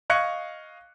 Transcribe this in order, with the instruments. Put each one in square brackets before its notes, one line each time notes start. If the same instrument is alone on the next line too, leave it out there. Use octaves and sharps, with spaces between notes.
[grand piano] D#5 F5 C#6 F#6 G#6 C#7